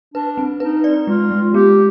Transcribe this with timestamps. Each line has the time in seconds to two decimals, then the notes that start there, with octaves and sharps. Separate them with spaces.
0.14 D4 B4
0.38 C4
0.60 D#4 B4
0.84 D5
1.07 G#3 F4
1.31 G#3
1.54 B3 G4